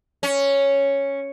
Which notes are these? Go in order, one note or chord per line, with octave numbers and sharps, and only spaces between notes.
C#4